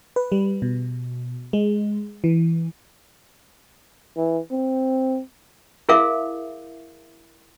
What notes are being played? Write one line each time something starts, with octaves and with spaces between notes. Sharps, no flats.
B4
G3
B2
G#3
E3
E3
C4
E4 G#4 A#4 E5 F5